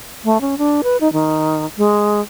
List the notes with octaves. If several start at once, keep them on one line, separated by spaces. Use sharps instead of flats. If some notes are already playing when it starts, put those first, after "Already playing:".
A3
C#4
D4
B4
D#4
D#3
G#3